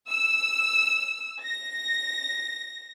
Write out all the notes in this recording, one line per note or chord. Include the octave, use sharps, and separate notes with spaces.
E6
A#6